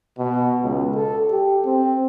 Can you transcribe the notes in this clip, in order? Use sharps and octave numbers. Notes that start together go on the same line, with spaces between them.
B2
C#2
A4
G4
C4